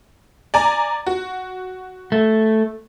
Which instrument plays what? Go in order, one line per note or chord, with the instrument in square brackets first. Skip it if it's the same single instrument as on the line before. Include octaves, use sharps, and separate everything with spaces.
[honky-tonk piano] D5 G#5 A#5
F#4
[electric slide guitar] A3